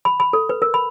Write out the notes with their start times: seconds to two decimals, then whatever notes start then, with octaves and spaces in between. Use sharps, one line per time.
0.05 B5
0.20 B5
0.33 A4
0.49 B4
0.62 A#4
0.74 B5